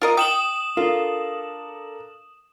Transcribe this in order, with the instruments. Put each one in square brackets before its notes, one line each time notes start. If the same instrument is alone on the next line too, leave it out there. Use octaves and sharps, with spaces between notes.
[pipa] F4 A#4 D#5
[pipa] G5 [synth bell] D#6 E7 F#7
[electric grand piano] D4 A4 A#4 [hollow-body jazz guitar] F4